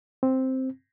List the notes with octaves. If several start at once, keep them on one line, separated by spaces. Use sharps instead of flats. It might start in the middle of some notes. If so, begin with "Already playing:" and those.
C4